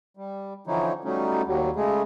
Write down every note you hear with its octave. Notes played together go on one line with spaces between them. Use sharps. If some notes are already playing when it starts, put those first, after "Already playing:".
G3
D3 E3 F3 C#4 D#4 E4
F#3 G3 A3 C#4 D#4
D#2 F#3 G3
C#3 G#3 A3 G#4